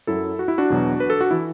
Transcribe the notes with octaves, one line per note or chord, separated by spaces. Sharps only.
F#2 F#3 E4 A4
F#4
E4
D4 F#4
E2 B2 F#3
B4
A4
F#4
E3 E4